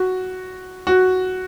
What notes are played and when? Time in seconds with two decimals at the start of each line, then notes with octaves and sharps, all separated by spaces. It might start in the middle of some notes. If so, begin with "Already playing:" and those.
Already playing: F#4
0.87 F#4